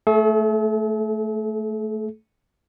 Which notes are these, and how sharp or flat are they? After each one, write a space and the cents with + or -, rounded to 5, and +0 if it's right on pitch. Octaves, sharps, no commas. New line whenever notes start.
A3 +0 A4 -45